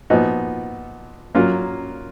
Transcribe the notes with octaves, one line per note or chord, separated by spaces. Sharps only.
A#2 F3 B3 D#4 F#4
F#3 A#3 C#4 F4 A#4